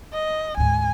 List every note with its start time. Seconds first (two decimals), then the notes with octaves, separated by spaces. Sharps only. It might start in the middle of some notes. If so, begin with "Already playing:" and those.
0.13 D#5
0.57 D2 G#2 G#5